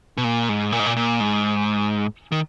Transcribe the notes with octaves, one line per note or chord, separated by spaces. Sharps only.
B2
A#2
G#2
A#2
G#2
A#2
A#2
G#2
D#3